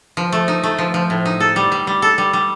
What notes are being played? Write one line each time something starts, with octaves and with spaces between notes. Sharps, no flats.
F3
A3
D#4
A3
F3
F3
A2
D#4
A4
G3
G3
G3
A4
G3
G3